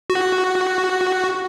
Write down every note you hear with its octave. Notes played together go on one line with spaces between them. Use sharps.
F#4